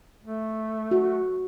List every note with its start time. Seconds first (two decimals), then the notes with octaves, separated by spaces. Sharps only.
0.24 A3
0.91 F#4